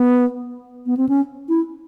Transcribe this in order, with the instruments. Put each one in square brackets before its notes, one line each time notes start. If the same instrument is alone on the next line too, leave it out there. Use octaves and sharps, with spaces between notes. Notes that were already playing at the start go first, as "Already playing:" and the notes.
Already playing: [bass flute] B3
B3
C4
C#4
E4